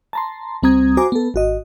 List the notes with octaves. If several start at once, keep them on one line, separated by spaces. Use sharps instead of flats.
A5 A#5 C6
C#2 G3 C4 A#5 D#6 G#6
F#4 C5 G#5 A#5 D6
B3 A4
G#1 F#4 D#5